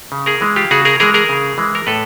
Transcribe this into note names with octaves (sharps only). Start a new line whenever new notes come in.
C#3
G#4 A#4
E3 G#3
F4 G4
C#3 F#4 G#4
G#4 A#4
E3 G#3 G#4 A#4
G#4 A#4
C#3
E3 G#3
A#4
A2 A4 B4